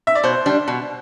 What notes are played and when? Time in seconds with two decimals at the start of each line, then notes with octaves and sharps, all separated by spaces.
0.07 E5
0.15 D5
0.24 B2 C5
0.46 G3 D4
0.68 B2